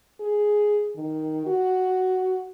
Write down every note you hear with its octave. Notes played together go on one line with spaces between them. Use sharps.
G#4
D#3
F#4